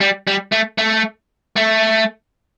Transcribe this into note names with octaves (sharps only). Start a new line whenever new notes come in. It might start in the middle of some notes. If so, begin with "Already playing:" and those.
G3
G3
A3
A3
A3